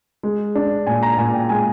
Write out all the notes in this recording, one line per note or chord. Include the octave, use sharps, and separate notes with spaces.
G#3
D4
A#2 G#5
A#5
A#2 G#5
G5
G#3 G#5